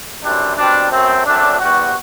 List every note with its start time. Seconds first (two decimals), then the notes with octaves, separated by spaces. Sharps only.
0.23 F#2 E3 G3 C4 D4
0.57 B2 G3 C4 D4
0.91 F#2 F#3 A3 C4
1.25 F#2 F#3 A3 C4 D4
1.59 E2 C3 G3 B3 F#4